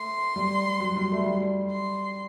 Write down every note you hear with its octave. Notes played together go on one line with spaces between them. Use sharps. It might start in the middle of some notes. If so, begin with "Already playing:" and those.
Already playing: A3 C6
G3
F#3
G3
A3
G3
C6